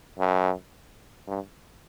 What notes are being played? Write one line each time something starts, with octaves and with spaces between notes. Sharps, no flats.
F#2
G2